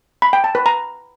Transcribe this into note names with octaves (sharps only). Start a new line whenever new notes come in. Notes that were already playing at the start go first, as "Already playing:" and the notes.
B5
G5
A5
B4
A#5